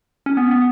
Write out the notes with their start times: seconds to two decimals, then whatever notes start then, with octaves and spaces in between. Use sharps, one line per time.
0.26 C#4
0.37 B3
0.51 B3